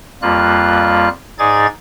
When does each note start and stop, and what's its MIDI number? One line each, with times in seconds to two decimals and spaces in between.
0.22 1.08 41
0.22 1.08 55
0.22 1.08 58
0.22 1.08 65
0.22 1.08 90
1.39 1.66 44
1.39 1.66 63
1.39 1.66 68
1.39 1.66 74
1.39 1.66 92
1.39 1.66 93